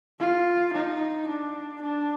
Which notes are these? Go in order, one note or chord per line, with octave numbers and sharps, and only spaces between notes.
F4
D#4
D4
D4